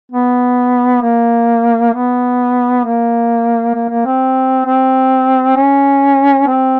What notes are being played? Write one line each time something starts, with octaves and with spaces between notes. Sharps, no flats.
B3
A#3
B3
A#3
A#3
A#3
C4
C4
C#4
C4